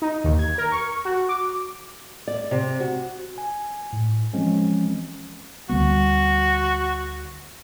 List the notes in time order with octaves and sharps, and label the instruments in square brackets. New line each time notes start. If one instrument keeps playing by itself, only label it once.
[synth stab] D#4
D#2
G#6
A#4
C#6
F#4
D6
[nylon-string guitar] D5
C3
F#4
[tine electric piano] G#5
A2
E3 F3 G#3 C4 C#4
[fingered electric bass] D2 G3 B3 [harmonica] F#4